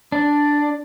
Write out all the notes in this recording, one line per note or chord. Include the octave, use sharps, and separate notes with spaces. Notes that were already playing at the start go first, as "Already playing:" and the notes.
D4